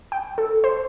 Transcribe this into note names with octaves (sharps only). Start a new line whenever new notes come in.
G5
A4
C5